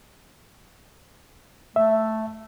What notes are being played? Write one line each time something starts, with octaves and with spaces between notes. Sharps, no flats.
A3 E5